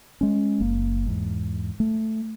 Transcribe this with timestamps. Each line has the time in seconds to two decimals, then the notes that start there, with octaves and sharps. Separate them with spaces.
0.21 G#3 C#4
0.60 F#1 A#3
1.06 E2 G#2
1.80 A3